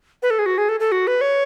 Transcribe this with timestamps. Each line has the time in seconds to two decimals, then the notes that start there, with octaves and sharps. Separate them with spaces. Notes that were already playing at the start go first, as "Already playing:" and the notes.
0.23 B4
0.30 A4
0.39 G#4
0.46 F#4
0.58 G#4
0.69 A4
0.80 A4
0.92 F#4
1.07 B4
1.21 C#5